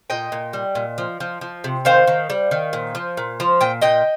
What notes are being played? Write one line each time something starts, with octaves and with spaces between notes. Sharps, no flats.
A#2 D#5 G5
A#2
G3
A#2
F3
F3
F3
C3
D#3 C5 F5
D#3
G3
D#3
A#2
F3
A#2
F3
A#2 G5
A#2 D#5 G5